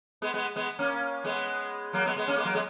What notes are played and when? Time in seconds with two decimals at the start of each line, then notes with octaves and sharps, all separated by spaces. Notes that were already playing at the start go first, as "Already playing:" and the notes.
0.22 G#3 B3
0.34 G#3 B3
0.56 G#3 B3
0.79 A#3 C#4
1.24 G#3 B3
1.93 F#3 A#3
2.05 G#3 B3
2.16 G#3 B3
2.28 A#3 C#4
2.37 G#3 B3
2.45 F#3 A#3
2.54 G#3 B3